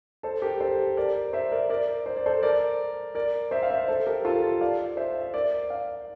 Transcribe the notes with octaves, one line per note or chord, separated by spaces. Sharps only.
A4 C5
G4 A#4
A4 C5
A#4 D5
C5 E5
A#4 D5
A#4 D5
C5
D5
A4 C5
A#4 D5
A#4 D5
C5 E5
F5
C5 E5
A4 C5
G4 A#4
F4 A4
D5 F5
C5 E5
E5
A#4 D5
D5 F5